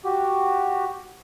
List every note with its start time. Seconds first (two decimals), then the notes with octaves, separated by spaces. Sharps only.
0.05 F#4 G4